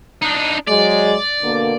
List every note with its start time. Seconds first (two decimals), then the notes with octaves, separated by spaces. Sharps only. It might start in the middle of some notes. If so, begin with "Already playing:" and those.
0.22 D4 D#4
0.68 F#3 G#3 D5
1.42 B2 D3 A#3